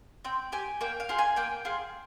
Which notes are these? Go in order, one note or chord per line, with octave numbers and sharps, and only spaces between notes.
C4 G5
G4 G#5
A#3 G5
F5
F4 G#4
G#5
A#3 G5
F4 G#4